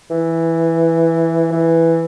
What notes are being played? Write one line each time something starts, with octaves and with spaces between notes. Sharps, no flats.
E3
E3